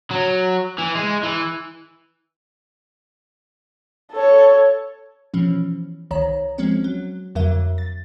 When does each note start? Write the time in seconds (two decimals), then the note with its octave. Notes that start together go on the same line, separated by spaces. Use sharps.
0.11 F#3
0.78 E3
0.95 G#3
1.23 E3
4.13 A4 C#5
5.34 B2 E3 F3 C#4
6.11 C2 D#3 C#5 A#5
6.58 F3 G#3 C4 C#4
6.84 F#3
7.35 F2 D3 F#3 A#4 E5
7.78 A6